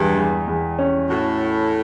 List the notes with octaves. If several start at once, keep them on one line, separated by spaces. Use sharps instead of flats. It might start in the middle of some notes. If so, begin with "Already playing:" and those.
Already playing: E2 G2 G3
E2
E2
C#4
A2 F#4